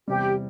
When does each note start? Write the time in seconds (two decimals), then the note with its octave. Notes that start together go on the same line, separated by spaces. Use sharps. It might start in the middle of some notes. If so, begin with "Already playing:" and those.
0.08 E2 C3 G3 G4